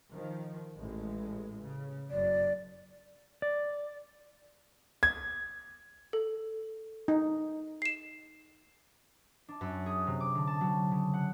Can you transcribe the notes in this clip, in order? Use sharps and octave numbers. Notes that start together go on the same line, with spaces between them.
D#3 F3
A1 G#3
C#3
F#1 F#2 D5
D5
G#6
A4
D#4
C7 E7
D4
F#2
G#4
C3
D6
D3
A5
F#3
C#3
F#5